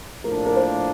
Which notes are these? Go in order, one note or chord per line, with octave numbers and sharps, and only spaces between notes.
A2 F3 A#3 D4 A#4
A#4
C5